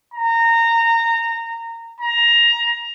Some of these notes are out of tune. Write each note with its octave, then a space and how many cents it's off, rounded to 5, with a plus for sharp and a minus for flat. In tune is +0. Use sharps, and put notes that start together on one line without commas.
A#5 -20
A#5 +15